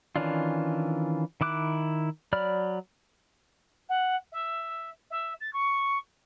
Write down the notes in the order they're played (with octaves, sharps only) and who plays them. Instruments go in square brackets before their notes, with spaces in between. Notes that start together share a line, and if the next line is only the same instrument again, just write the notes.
[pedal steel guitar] D#3 E3 C#4 D4 F4
D#3 E4 D6 F#6
F#3 D5 B5 F6
[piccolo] F#5
E5
E5
A6
C#6